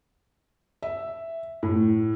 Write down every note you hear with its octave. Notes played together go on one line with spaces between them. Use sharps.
E5
A2